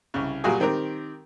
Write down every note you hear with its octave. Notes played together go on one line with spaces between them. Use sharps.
C2 C#3
A#2 F#3 G3 F4 F#4 G#4
D#3 C4 G4 A#4